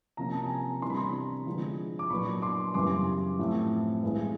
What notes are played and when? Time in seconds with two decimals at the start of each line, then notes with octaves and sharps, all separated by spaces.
0.17 C3 F3 A#3 C#4 A#5
0.32 A5
0.46 G#5 A#5
0.82 C3 E3 G3 B3 D4 C6
0.90 B5
0.97 A#5 C6
1.46 D3 F3 G#3 B3
1.99 D6
2.10 A#2 F#3 B3 D4 B5 C#6
2.42 C6 D6
2.74 F#2 C#3 E3 G3 B3 C6 D6
3.38 A2 F3 A3 C4
4.03 G2 E3 G#3 B3